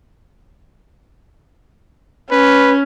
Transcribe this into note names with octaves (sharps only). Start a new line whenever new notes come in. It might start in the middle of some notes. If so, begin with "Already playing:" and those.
C#4 B4